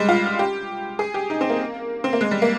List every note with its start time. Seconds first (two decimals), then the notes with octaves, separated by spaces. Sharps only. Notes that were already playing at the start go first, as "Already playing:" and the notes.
Already playing: G3 G#3
0.09 F4
0.39 G4
0.99 G#4
1.14 G4
1.30 D#4
1.41 C4
1.50 A#3
2.04 C4
2.13 A#3
2.21 G#3
2.31 G3
2.42 A#3